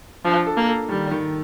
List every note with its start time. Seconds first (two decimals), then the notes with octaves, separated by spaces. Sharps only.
0.25 F3 D4
0.46 A4
0.57 A#3
0.68 A4
0.89 D#3 G3
1.11 D#3